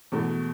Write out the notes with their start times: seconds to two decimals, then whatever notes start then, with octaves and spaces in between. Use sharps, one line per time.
0.12 E2 B2 A3